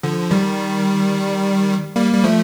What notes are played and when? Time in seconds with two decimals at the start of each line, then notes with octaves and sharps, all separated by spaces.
0.03 D3 F3
0.31 D#3 G3
1.96 G3 A#3
2.13 G3
2.24 F3 A3